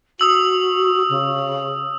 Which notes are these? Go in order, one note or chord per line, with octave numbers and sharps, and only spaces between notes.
F#4 D#6 E6 F#7
C#3